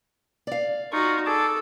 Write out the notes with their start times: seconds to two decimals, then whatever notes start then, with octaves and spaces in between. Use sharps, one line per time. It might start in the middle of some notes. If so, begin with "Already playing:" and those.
0.47 D5 F5
0.92 D#4 F4 F#4 C#6
1.26 G#4 A4 A5 D6